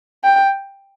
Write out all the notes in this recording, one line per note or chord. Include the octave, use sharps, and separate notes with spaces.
G5